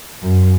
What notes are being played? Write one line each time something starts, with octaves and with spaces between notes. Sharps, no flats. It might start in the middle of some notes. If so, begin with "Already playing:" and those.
F#2